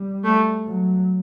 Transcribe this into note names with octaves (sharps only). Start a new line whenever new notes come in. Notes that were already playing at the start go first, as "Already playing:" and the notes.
Already playing: G3
A3
F#3